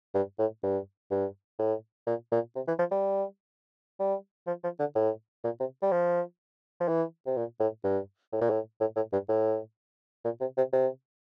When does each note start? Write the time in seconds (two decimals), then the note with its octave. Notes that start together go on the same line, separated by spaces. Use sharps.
0.15 G2
0.39 A2
0.63 G2
1.11 G2
1.59 A2
2.07 A#2
2.32 A#2
2.56 C3
2.68 E3
2.79 F3
2.91 G3
4.00 G3
4.47 F3
4.64 F3
4.79 D3
4.95 A2
5.45 A#2
5.60 C3
5.82 G3
5.92 F3
6.81 F3
6.88 E3
7.27 C3
7.37 A#2
7.60 A2
7.84 G2
8.33 A2
8.41 A#2
8.50 A2
8.80 A2
8.96 A2
9.13 G2
9.29 A2
10.25 A#2
10.41 C3
10.58 C3
10.73 C3